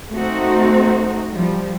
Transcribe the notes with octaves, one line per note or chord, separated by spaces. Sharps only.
A3 C4 D#4 F#4
F3 G3